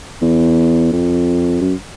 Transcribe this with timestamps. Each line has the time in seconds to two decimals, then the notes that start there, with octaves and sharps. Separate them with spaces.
0.22 E2
0.93 F2
1.62 F#2